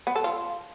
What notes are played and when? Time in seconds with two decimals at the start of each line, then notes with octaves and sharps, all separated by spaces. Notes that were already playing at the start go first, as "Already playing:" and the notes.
0.07 B3
0.16 A4
0.24 F4